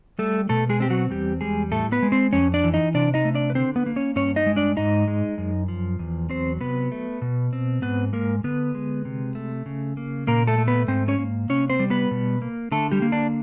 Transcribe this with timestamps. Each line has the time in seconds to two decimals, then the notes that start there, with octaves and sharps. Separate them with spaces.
0.19 G3 A3 A4
0.49 B2 A3 A4
0.69 G#3 G#4
0.80 C4 G4
0.90 F#3 F#4
1.10 E2 G3 G4
1.41 G3 G#3 G#4
1.72 A2 A3 A4
1.92 B3 B4
2.03 G#3
2.12 C4 C5
2.33 F2 C#4 C#5
2.54 D4 D5
2.64 E3
2.74 D#4 D#5
2.94 C3 D4 D5
3.14 D#4 D#5
3.25 A3
3.35 D4 D5
3.50 B4
3.55 D3 C4 C5
3.76 B3 B4
3.86 A#3
3.96 C#4 C#5
4.16 G2 C#4 C#5
4.36 D#4 D#5
4.46 G#3
4.56 D4 D5
4.77 G#2 D#4 D#5
5.08 G#3
5.38 F#2
5.68 F3
5.99 E2
6.30 F#3 C4 C5
6.61 C3 B3 B4
6.92 A3
7.22 B2
7.53 C4
7.82 G#2 B3 B4
8.13 G#3 A#3 A#4
8.44 D3 B3 B4
8.75 G#3
9.05 C3
9.35 A3
9.66 C#3
9.97 A#3
10.27 A#2 A#3 A#4
10.47 A3 A4
10.58 A3
10.67 B3 B4
10.88 G#2 C4 C5
11.08 C#4 C#5
11.18 A#3
11.49 C3 C#4 C#5
11.70 C4 C5
11.79 G3
11.90 B3 B4
12.11 B2
12.42 A#3
12.72 D3 A3 A4
12.92 G3 G4
13.02 A#3
13.12 D4